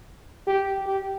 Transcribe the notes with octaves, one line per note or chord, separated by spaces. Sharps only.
G4
G4